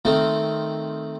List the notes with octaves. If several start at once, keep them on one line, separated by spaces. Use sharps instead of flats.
D#3 A3 C4